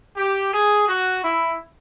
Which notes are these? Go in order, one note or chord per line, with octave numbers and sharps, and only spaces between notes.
G4
G#4
F#4
E4